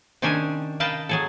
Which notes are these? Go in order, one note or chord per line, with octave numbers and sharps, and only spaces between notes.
C3 D#3 C#4 D4 C5 G#5
A#4 B4 D#5 F5 G5 A5
F#3 G#4 A4